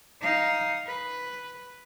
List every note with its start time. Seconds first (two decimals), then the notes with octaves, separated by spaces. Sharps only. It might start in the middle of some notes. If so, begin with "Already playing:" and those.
0.22 D#4 F5
0.87 B4